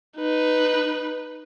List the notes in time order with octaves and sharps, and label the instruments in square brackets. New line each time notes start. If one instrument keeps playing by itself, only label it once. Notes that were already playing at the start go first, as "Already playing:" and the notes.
[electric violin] D#4 B4